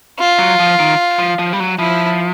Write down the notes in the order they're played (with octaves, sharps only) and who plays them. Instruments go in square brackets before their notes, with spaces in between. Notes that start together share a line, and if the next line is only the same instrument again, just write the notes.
[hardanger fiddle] F4
[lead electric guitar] F#3
F3
D#3
F3
F3
G3
F#3
[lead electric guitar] F3 [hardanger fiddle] E4